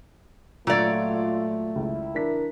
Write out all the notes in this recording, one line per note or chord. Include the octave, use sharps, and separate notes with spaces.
A#2 F#3 A3 F4 C#5 D5
C#2 E4
E3 D4 A#4 B6